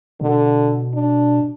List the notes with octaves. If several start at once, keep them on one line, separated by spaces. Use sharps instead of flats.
B2 D3
D4